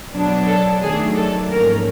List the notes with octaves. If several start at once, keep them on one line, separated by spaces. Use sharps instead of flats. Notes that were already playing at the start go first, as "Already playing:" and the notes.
B2 F#3 B3 D4
A4
D#3 F#3 A3 D4 G#4
A4
G#2 F3 A#3 C#4 A#4